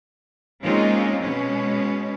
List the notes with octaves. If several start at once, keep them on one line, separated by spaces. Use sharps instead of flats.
G#3 A#3 C4 C#4 D#4 F4
B2 G#3 C#4